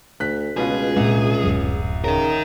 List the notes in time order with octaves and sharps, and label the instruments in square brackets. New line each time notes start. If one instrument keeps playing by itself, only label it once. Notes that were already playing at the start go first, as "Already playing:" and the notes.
[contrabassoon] D2 [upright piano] F#6 B6
[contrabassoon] C#2 [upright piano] B2 F4 [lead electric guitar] G#4
[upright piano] C2 [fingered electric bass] A#2 G#3
[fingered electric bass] D1 F#2 F#3
[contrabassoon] C#3 [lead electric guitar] D#4 A#4